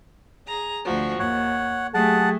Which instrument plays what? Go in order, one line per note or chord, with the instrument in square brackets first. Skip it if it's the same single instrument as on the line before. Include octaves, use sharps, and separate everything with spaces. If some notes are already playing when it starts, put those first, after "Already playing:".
[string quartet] G#4 A#5
D2 F3 F#4
[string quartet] D#2 [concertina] C#5 F#5
[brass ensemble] F#3 G4 G#4 [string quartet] A3 [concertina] F#5 A5